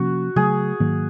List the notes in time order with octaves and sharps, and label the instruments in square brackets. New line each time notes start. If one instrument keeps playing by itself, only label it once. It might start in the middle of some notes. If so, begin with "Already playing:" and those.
Already playing: [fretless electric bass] C3 F3 A#3 C#4 [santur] F#4
[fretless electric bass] C#3 F#3 A3 [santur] G#4
[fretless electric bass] G#2 D#3 F#3 A#3